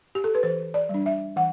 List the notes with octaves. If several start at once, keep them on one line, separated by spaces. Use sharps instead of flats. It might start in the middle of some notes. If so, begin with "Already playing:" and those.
G4
A4
B4
E3 C5
D5
G3 D4
E5
E3 F#5